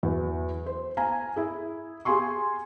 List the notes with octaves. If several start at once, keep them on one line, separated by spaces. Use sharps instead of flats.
E2 F#3
C5
F5 G#5 A#5
E4 G#4
G4 G#4 F5 G#5 C6 C#6